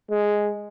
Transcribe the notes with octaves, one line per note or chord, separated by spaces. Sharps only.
G#3